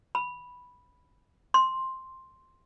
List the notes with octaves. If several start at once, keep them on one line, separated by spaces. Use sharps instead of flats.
B5
C6